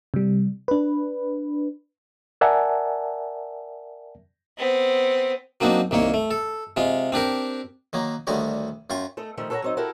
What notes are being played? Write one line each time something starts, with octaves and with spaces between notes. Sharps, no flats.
C3 G3
D4 B4
A#4 D5 E5 F#5 G#5 A5
B3 C4
F#3 A#3 C4 D4 D#4
C2 D#3 A#3 C#5
A3
A4
C3 G#3 F4
C4 D4 G4 A#4
D#3 F#3 A#3
D2 D3 D#3 G3 F#4 C#5
F#2 F4 G5 C#6
A3 A4 D#5
D#3 F3 G3 A3
A4 B4 C#5 E5 F#5 A#5
F#3 C4 D#4
E4 F#4 G4 A4 A#4 E5